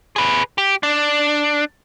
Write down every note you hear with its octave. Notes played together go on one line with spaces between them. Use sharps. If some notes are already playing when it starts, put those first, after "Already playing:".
G#4 B4
G4
D4